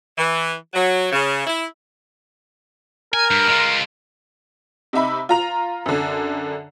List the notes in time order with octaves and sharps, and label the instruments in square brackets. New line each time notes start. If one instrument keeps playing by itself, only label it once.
[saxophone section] E3
F#3
C#3
E4
[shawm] A#4 [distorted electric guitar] G#5
[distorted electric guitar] G2
G#3 F4
[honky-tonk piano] C3 D#4 E5 B5
F4 A#5 F7
F#2 D3